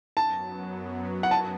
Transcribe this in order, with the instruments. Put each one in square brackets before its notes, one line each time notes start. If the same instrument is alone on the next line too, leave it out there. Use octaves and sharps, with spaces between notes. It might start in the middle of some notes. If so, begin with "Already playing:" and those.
[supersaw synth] F#2 F#3 B3 [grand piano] A5
[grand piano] F#5
A5